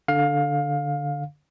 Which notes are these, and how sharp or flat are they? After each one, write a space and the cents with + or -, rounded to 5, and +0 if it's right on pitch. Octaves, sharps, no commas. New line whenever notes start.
D3 +0 F5 +20